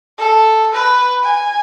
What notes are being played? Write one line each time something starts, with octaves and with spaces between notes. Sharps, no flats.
A4
B4
G#5